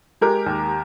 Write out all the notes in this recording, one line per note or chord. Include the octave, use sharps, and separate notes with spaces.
G#3 G4 A#4
D#2